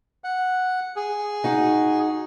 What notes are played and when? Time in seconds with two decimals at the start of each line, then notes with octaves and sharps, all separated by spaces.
0.24 F#5
0.96 G#4
1.44 D#4 F#4